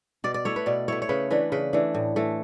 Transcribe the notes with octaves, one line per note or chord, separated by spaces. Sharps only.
B2 D5
D5
A3 E4 C#5
B4
B2 D5
A3 E4 C#5
C#5
C#3 B4
E3 A3 D4 B4
C#3 B4
E3 A3 D4
A2
E3 A3